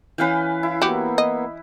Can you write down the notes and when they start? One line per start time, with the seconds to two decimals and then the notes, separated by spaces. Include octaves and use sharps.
0.18 E3 C#4 B4 F5 G5
0.63 E4 F5
0.82 A#3 B3 F#4 G4
1.18 D#5